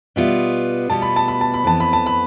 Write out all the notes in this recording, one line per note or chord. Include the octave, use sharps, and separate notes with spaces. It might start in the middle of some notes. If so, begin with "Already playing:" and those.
B2 G3 B3 F4 E5
B2 G3 B3 F4 A5
B5
A5
B5
A5
B5
F2 E3 B3 A5
B5
A5
B5